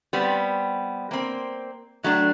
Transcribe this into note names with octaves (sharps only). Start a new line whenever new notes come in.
G3 B3 C4
A#3 C4
A2 F#3 A3 D4